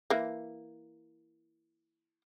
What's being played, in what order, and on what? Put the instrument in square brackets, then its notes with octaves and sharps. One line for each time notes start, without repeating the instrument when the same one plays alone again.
[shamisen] E3 A#3